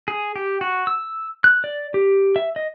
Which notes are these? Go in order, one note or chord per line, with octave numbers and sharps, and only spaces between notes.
G#4
G4
F#4
E6
F#6
D5
G4
E5
D#5